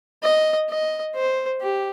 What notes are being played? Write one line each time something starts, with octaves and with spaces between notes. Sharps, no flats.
D#5
D#5
C5
G4